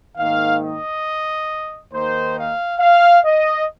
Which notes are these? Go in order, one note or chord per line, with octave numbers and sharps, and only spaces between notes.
G#2 D#3 A#3 D#4 F5
D#5
D#2 D#3 A#3 D#4 C5
F5
F5
D#5